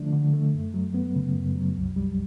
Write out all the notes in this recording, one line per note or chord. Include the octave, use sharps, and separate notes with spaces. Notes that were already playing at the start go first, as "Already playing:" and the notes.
Already playing: D3 F3 A3 D4
D3
A3
F#2
F#3
B3
C#3
F#2
F#3
C2
G3